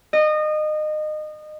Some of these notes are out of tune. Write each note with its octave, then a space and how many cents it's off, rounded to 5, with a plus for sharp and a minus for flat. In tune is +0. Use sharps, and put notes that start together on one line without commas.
D#5 -25